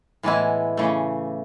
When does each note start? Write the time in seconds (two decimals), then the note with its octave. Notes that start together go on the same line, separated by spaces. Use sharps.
0.23 A2 E3 G#3 B3 E4
0.77 C#3 E3 A3